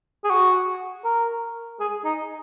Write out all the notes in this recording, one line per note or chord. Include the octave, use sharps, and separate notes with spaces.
G#4
F#4
A#4
G#4
D#4